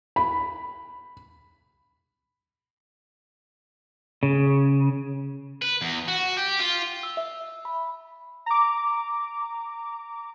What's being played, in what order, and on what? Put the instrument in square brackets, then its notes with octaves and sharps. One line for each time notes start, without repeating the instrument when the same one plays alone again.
[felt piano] B5
[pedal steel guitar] C#3
[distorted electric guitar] B4
E2
F#4
G4
F4
[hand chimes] E6
E5
B5
[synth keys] A#5 D6